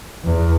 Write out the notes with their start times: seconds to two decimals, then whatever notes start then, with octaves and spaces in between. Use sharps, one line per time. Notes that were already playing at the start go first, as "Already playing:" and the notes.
0.25 E2